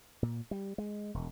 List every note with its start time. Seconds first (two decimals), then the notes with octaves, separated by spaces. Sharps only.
0.22 A#2
0.51 G3
0.78 G#3
1.14 E1